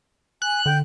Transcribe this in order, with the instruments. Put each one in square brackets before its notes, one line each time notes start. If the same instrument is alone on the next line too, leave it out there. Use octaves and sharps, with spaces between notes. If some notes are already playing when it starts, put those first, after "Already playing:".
[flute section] G#5 [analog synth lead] F#6
[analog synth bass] D3 [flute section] G5 G6